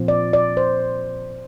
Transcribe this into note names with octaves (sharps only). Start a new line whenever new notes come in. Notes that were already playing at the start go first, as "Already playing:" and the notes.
Already playing: A#2 F3 C4 F4
D5
D5
C5